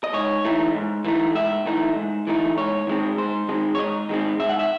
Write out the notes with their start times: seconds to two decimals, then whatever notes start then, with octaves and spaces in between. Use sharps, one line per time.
0.04 D#5
0.13 G#2 C#5
0.44 E3 A3 D#4
0.75 G#2
1.05 E3 A3 D#4
1.35 G#2 E5
1.66 E3 A3 D#4
1.96 G#2
2.27 E3 A3 D#4
2.57 G#2 C#5
2.87 D#3 G#3 C4
3.18 G#2 C5
3.49 D#3 G#3 C4
3.75 C#5
3.78 G#2 D#5
4.09 D#3 G#3 C4
4.40 G#2 E5
4.49 F#5
4.59 E5